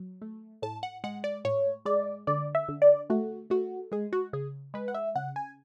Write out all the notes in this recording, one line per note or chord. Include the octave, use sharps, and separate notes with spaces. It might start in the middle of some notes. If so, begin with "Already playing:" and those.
Already playing: F#3
A3
A2 A5
F#5
G#3 F#5
D5
A2 C#5
G#3 D5
D3 D5
E5
D3
D5
A3 F#4
A3 F#4
G#3 G#4
F#4
C#3 G#4
G#3 B4
F#5
E5
C#3 F#5
G#5